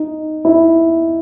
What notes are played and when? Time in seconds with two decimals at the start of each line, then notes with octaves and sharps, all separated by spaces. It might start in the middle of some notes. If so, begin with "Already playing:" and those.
Already playing: D#4
0.45 E4